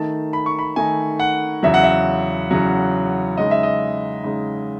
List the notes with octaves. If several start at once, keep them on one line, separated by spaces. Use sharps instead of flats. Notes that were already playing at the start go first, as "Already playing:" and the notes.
Already playing: D#3 A3 D#4 A5
B5
C#6
B5
D#3 A3 D#4 G#5
F#5
E2 C#3 F#3 E5
F#5
E5
E2 C#3 F#3
C#3 G#3 D#4 D#5
E5
D#5
C#3 G#3 D#4